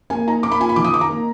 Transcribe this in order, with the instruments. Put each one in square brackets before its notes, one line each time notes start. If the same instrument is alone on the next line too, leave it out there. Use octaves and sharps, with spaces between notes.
[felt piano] A#3 G#5
D#4 A#5
A#3 D6
B5
F4 G#5
B5
D#3 D6
D#6
D#4 D6
A#5
A#3